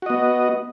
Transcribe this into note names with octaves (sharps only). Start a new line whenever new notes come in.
B3 F#4 D#5